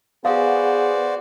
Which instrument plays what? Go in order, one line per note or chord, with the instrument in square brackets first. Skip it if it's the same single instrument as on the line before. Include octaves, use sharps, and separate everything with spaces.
[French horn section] B3 G#4 [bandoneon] F#4 C5 D5 [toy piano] F5